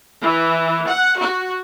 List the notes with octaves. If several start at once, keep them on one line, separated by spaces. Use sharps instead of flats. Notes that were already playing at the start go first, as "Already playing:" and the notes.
E3
F#5
F#4